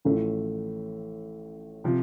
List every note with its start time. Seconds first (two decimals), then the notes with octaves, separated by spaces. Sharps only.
0.05 A1 A2 F3 A3
1.84 C3 F3